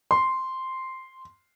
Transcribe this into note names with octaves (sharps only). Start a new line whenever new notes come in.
C6